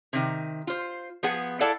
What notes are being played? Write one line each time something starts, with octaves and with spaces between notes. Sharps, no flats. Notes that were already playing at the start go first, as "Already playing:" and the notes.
C3 D#3
F4 C5
F3 B3 G#4 F#5
E4 A4 D5 F5 F#5 A5